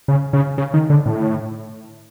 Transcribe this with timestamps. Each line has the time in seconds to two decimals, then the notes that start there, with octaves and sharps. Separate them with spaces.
0.08 C#3
0.33 C#3
0.58 C#3
0.74 D#3
0.90 D3
1.06 A2